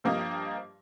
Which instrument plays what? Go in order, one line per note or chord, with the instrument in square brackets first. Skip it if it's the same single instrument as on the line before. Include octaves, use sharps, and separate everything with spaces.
[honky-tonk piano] G2 F3 A#3 G4 D#5 F5